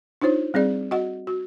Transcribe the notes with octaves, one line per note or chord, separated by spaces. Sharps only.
D4 D#4 F4 C5 C#5
G3 C4 G#4 D5
F#4 D#5 F#5
F#4